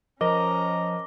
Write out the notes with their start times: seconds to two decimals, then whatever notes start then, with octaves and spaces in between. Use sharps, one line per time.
0.21 F3 C#4 A#4 D#5 A#5 D6 A#6 G7